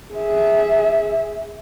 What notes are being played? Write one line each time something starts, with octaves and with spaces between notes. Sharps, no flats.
G#4 E5